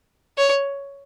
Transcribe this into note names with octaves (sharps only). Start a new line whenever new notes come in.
C#5